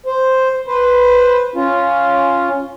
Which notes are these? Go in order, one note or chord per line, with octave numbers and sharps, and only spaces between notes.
C5
B4 C5
C#4 F4